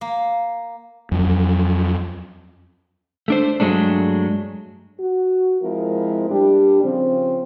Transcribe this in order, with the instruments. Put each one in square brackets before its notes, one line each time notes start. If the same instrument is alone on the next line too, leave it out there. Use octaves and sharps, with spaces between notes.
[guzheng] A#3
[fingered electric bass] F2 F#3
[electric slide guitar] A3 D4 C5
G2 F#3 G#3 A3 D4
[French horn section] F#4
F3 G#3 C4 E4 A#4
A#2 G3 D4 G4
C#3 F3 C4